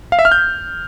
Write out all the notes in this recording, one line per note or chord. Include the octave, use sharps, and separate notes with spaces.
F5
E5
F6
G6